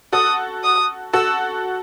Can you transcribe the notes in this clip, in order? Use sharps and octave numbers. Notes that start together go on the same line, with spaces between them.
F#4 A4 D#6
D#6
F#4 A4 E6